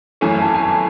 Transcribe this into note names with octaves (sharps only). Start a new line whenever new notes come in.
G#1 F#2 E3 A3 C#4 G#5
A5
G#5
A5